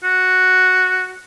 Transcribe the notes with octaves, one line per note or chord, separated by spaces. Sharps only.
F#4